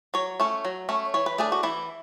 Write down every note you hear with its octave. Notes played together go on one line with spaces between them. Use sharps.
F#3 C#5
A3 C#4
F#3
A3 C#4
E3 C#5
B4
A3 D4 G#4
F#4
E3 E4